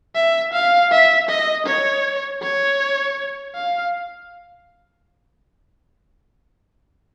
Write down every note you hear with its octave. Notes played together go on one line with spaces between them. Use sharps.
E5
F5
E5
D#5
C#5
C#5
F5